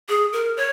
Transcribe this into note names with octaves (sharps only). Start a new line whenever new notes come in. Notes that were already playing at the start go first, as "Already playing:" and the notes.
G#4
A#4
C#5